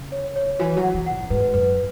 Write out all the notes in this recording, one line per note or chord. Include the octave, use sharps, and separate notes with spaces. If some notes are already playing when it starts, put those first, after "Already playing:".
Already playing: C#3
C#5
C#5
E3 F#4
F#3
F#5
E3
F#5
G#2
G#2 B4
F#2 B4